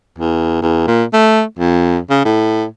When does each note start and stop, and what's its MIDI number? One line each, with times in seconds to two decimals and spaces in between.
0.18 0.57 40
0.62 0.86 40
0.87 1.04 46
1.13 1.42 57
1.59 1.99 41
2.10 2.23 49
2.25 2.65 45